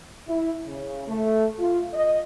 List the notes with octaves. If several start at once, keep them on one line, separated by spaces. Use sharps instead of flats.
E4
C#3
A3
F4
D#5